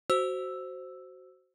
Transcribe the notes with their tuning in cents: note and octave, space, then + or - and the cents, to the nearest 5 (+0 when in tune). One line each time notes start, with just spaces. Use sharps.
F#4 +10 C5 +0 E6 +0